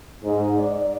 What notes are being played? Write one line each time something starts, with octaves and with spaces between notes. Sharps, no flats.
G#2
D5